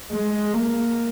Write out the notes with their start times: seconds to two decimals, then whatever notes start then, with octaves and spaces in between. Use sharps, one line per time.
0.12 G#3
0.54 A#3